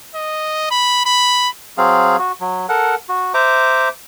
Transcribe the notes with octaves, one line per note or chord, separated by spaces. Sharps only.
D#5
B5
B5
F#3 C4 G#4 F5
F#4
F#3
A4 A#4 F#5
F#4
C5 E5 A#5 D6